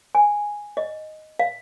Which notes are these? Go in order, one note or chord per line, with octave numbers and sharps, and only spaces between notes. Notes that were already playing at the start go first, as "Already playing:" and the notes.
G#5
D#5
F5